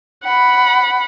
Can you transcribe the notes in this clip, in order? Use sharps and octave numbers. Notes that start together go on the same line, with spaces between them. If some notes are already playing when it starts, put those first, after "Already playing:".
F#5 B5